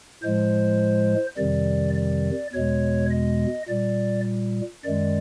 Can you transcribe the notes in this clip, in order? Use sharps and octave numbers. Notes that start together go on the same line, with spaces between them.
A2 F3 G#3 C5
F2 C3 D#3 G3 D5
D5
E2 B2 G#3 C#5
D#5
A#2 G3 D5
F#2 D#3 G#3 D5